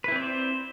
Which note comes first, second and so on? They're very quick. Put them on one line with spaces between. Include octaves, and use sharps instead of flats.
B4 E4 C4 D5 C5